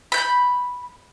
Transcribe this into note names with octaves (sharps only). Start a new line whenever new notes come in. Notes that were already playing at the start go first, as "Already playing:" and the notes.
B5 G6